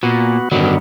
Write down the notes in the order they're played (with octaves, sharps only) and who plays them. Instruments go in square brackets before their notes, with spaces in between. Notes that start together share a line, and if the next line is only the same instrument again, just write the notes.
[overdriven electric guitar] A#2 [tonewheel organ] B3 F#4
[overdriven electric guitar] G2 F#3 [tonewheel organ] D3 D#3 B3